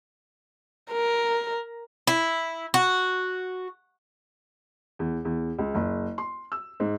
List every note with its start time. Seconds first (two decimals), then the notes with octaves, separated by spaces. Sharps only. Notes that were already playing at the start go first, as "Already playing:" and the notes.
0.92 A#4
2.07 E4
2.74 F#4
4.99 E2
5.25 E2
5.59 C#2
5.75 F#1
6.18 C6
6.52 E6
6.80 G#2